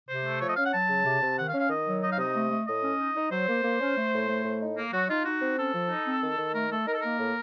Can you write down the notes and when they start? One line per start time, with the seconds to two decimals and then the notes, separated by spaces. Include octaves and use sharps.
0.08 C3 C5
0.25 A3
0.40 F3 C#5
0.49 D#5
0.57 C#4 F5
0.66 F#5
0.74 F#3 A5
0.89 C#3
1.05 C3
1.21 C3
1.38 D#3 F#5
1.48 F5
1.54 C#4
1.59 F5
1.70 D#3 D#5
1.87 F#3
2.02 D#4 D#5
2.12 F5
2.18 C3 D#5
2.35 A3
2.51 A3
2.67 A2 D#5
2.83 C#4
3.00 D#4
3.15 D#4
3.32 F#3 C5
3.48 A#3
3.64 A#3
3.80 C#4
3.96 A3
4.13 A2
4.28 A3
4.45 A2
4.61 D#4
4.77 A#3
4.93 F#3 F#4
5.09 D#4 F4
5.25 D#4 F#4
5.41 C4
5.58 C#4 A4
5.74 F3
5.90 D#4
6.06 C4
6.23 D#3
6.38 D#3
6.55 A3 A#4
6.70 A3 A4
6.87 D#4 A#4
6.94 A4
7.02 A#3 A#4
7.19 A2